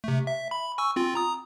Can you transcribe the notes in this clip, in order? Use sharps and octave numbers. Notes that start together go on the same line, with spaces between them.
C3 A3
E5
B5
G#5 C#6 E6
C4 F4
A#5 D#6